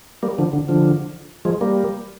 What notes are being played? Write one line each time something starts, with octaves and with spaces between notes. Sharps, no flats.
G3 A#3
D3 F3
D3
D3 F3
F3 G#3
G3 A#3